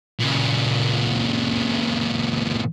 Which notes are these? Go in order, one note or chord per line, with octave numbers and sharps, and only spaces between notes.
A#2 C#3